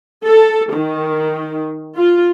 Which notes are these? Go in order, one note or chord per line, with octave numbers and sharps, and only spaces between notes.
A4
D#3
F4